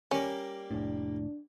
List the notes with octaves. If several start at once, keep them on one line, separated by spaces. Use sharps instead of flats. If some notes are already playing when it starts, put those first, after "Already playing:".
G3 A#3 C#4
F1 A2 D4